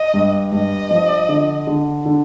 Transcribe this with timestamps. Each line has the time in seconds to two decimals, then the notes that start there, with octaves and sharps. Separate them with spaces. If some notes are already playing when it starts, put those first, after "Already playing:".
Already playing: D#5
0.14 G2
0.52 G2 D#5
0.91 F3
1.29 D3
1.67 D3
2.06 D3